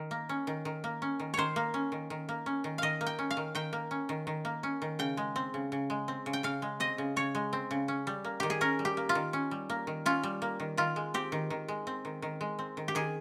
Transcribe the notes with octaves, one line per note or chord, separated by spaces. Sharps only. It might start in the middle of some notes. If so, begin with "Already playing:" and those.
Already playing: D#3
A#3
C#4
D#3
D#3
A#3
C#4
D#3
D#3 C5 C#5
A#3
C#4
D#3
D#3
A#3
C#4
D#3
D#3 D#5 F5
A#3
G5
C#4
F5
D#3
D#3 G5
A#3
C#4
D#3
D#3
A#3
C#4
D#3
C#3 G5
G#3
C4
C#3
C#3
G#3
C4
C#3
G5
C#3 F5
G#3
C4 D#5
C#3
C#3 C#5
G#3
C4
C#3
C#4
G3
A#3
D#3 G4
G#4
C#4 A#4
G3
G4
A#3
F4
D#3
C#4
G3
A#3
D#3
C#4 F4
G3
A#3
D#3
D#3 F4
G#3
C4 G4
D#3
D#3
G#3
C4
D#3
D#3
G#3
C4
D#3
G4
D#3 G#4